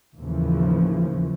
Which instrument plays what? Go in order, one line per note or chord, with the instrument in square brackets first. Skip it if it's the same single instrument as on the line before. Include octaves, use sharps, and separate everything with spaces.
[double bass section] D#2 A2 C#3 E3 F3